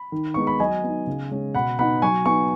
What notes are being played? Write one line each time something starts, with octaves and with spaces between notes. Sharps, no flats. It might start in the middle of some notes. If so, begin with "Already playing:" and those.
Already playing: B5
D#3
G#3 B3 D#4 C#6
B5
F#3 D#5 G#5
B3 D#4
C#3
G#3 C#4
B2 F#5 B5
B3 D#4 F#5 B5
F#3 G#5 C#6
B3 D#4 G#5 C#6